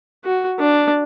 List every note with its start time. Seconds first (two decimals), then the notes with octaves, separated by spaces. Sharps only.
0.25 F#4
0.59 D4